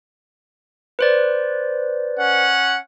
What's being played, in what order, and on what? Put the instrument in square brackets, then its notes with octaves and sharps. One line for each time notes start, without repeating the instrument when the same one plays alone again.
[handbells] B4 C5 D5
[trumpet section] C#4 F#5